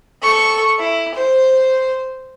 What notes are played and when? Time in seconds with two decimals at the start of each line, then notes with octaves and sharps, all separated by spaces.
0.22 A4 C#6
0.79 E4
1.15 C5